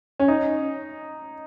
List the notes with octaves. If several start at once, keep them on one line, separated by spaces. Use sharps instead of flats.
C#4
D#4